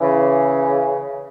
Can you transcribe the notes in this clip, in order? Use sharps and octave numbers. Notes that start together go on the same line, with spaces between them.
C#3 E3